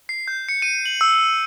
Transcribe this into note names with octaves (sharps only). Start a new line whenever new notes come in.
C7
G6
C#7
D#7
F#7
E6